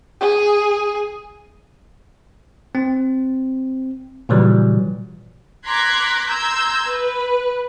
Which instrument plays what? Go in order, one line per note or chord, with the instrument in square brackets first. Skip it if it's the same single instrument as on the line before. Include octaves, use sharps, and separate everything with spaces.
[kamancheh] G#4
[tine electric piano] C4
A#2 C#3 E3 F#3 G3
[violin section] A#5 C6 D6 F#6 G#6 B6
A#5 C6 E6 G6 G#6
B4